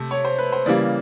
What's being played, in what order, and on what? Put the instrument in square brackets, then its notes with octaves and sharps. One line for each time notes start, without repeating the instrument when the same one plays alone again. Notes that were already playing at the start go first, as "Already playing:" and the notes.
Already playing: [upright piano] C3 A3
C#5
C5
B4
C5
C#3 E3 G3 A#3 D5